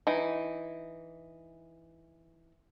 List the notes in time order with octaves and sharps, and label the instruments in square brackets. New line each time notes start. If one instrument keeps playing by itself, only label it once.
[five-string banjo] E3 D#4